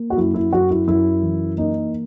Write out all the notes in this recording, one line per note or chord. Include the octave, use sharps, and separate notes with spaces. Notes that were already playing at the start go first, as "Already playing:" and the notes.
Already playing: A#3
F#4
F#2 E4
E4
F#2 F#4
E4
F#2 E4
E3
A#3 D#4